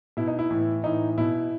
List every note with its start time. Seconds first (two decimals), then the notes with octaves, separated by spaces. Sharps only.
0.17 B2 E4
0.28 D#4
0.39 E4
0.50 A2 E3
0.84 A2 E3 D#4
1.18 B2 E4